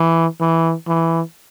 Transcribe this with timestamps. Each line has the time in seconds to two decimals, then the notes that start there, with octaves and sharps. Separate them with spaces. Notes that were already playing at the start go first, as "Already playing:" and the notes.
Already playing: E3
0.40 E3
0.88 E3